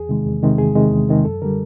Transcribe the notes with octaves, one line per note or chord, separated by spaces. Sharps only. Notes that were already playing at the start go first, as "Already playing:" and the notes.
Already playing: E2 G#4
C3 D#3 G#3
E2
C3 D#3 G#3
E2 G#4
C3 D#3 G#3
E2
C3 D#3 G#3
F#2 A4
D3 G3 A#4